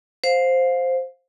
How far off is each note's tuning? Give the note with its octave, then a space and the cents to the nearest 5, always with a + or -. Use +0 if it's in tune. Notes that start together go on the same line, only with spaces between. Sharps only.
C5 +0 F5 +20